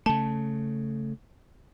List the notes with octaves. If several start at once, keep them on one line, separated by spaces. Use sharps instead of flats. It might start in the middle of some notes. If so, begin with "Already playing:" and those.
C#3 A3 A5